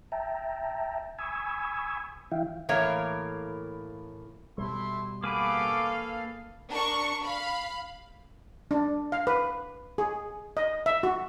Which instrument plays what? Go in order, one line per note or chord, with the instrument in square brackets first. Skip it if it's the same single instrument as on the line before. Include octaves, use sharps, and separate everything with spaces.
[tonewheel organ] E5 G5 A5 A#5
G#5 B5 C#6 D#6 E6 G#6
E3 E4 E5 F5 G5
[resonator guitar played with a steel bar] A2 E3 A#3 A#4 C#5 F5
[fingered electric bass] B2 G3 [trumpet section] A3 E4 C6
[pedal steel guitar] A#3 G#4 B4 [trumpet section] B3 C#6 D6 [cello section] A4 F5
[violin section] D4 A#4 C#6
F5 B5
[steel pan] D4
F5
B4
G#4
D#5
E5
F#4